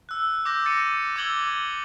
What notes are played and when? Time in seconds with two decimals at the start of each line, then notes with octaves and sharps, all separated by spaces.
0.09 E6 F#6
0.45 D6 E6 G6 A#6
0.65 A6 C#7 D#7
1.16 D6 E6 G#6 F#7 G7